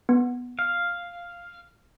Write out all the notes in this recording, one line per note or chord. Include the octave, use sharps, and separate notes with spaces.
B3
F5